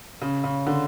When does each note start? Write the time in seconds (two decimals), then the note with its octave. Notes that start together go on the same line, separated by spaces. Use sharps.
0.22 C#3
0.44 C#3
0.67 D3